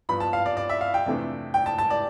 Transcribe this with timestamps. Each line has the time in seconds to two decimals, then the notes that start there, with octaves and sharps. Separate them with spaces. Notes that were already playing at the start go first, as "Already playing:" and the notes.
0.09 G2 F3 B3 B5
0.20 A5
0.33 F5
0.46 D5
0.57 D5
0.69 E5
0.81 F5
0.94 G5
1.06 F2 C3 E3 A3 D4
1.54 G5
1.66 A5
1.79 A5
1.90 D5